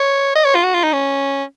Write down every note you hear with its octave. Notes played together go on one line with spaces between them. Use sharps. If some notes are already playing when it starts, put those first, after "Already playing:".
Already playing: C#5
D#5
C#5
F4
F#4
F4
D#4
C#4